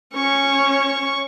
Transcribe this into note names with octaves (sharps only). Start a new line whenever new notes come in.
C#4 C#5 C#6